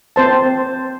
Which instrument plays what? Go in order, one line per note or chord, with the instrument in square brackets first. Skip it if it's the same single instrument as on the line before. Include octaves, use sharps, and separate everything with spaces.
[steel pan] C4 C5 A5